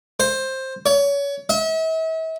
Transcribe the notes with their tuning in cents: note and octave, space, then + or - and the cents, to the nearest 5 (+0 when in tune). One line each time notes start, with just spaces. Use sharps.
C5 +10
C#5 +30
E5 -40